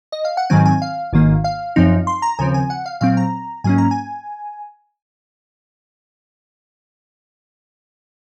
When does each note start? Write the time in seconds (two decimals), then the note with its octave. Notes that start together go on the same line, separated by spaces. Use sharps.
0.12 D#5
0.25 F5
0.37 F#5
0.50 G#2 D#3 F#3 C4 G#5
0.65 G#5
0.82 F5
1.13 G#1 G#2 D#3 A#3
1.44 F5
1.76 F#2 F3 C4 D#4
2.07 C6
2.22 A#5
2.39 D#2 C#3 F3 C4 G#5
2.54 G#5
2.70 F#5
2.86 F5
3.01 A#2 F#3 C4 F5
3.17 A#5
3.64 G#2 F#3 A#3 C#4 G#5
3.78 A#5
3.91 G#5